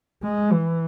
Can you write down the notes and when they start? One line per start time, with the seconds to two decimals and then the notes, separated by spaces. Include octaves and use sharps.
0.23 G#3
0.52 E3